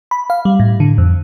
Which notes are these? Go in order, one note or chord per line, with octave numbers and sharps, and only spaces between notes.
B5
F5
G3
A2
D3
F2